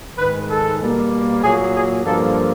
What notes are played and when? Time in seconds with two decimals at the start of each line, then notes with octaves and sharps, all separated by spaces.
0.18 G#2 D#3 G#3 B4
0.49 A4
0.81 B2 G3 A#3
1.42 A#2 F#3 A#3 G#4
1.74 G#4
2.04 G2 D3 F3 A#3 A4